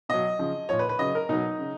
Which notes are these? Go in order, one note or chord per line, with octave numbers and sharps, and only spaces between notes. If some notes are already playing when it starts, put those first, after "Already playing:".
B2 F#3 D#5
C#3 F3
A#2 F3 C#5
B4
B4
C#3 F#3 D#5
A#4
B2 F#3 D#4
C#3